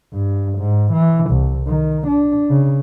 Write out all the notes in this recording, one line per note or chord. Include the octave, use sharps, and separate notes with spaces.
G2
G#2
E3
C2
D#3
D4
C#3